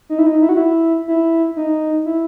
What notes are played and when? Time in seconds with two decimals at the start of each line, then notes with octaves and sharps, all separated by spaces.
0.09 D#4
0.19 E4
0.26 D#4
0.42 E4
0.49 F#4
0.57 E4
1.08 E4
1.57 D#4
2.06 E4